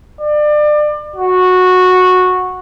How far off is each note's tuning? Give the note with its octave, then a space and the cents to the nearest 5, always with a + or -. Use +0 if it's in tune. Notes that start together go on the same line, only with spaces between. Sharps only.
D5 +30
F#4 -10